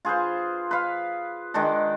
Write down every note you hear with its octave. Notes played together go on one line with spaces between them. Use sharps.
F4 G#4 B4 C5
B4 F5
D#3 G#3 D4